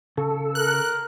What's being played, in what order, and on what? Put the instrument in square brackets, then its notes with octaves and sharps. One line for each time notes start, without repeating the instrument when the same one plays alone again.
[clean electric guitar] C#3 [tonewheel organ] A4
[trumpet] A#4 [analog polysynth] F#6